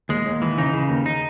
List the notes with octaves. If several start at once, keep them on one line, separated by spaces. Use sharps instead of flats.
D#2 G#3
D#2
E3
C#3 D#4
C#3
D#2
D#4